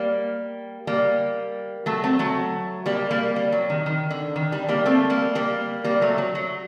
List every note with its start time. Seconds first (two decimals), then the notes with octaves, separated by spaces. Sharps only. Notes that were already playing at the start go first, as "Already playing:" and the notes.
Already playing: G3 A#3
0.87 G3 A#3
1.86 F#3 A3
2.04 A3 C4
2.19 F#3 A3
2.86 G3 A#3
3.11 G3 A#3
3.36 G3
3.52 F#3
3.70 D#3
3.86 D#3
4.11 D3
4.36 D#3
4.52 G3
4.68 G3 A#3
4.86 A3 C4
5.10 G3 A#3
5.35 G3 A#3
5.84 G3 A#3
6.01 F#3 A3
6.18 F#3
6.35 F#3